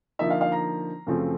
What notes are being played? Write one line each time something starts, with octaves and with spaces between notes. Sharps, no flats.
D3 F3 A#3 D#4 E5
F5
F5
A#5
F#2 C#3 F3 A3 C4